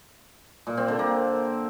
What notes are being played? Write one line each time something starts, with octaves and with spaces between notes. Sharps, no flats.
A#2
C4
D3
A#3